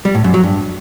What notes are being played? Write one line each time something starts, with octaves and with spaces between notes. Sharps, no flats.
G3
A2
F#2
F#3
G2